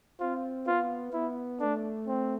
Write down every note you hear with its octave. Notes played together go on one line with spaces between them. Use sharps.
C4 F4
B3 F4
B3 E4
A3 D4
C4